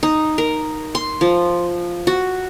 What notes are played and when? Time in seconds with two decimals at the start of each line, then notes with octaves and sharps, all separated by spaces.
0.03 D#4
0.38 A#4
0.95 C6
1.21 F3
2.07 F#4